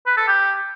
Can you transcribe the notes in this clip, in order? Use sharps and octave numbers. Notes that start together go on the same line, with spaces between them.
B4
A4
G4